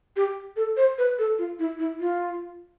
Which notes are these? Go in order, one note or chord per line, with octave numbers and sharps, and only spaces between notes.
G4
A4
C5
B4
A4
F4
E4
E4
F4